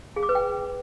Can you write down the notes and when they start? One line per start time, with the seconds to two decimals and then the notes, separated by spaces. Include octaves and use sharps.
0.16 G#4
0.23 D6
0.29 B4
0.35 G5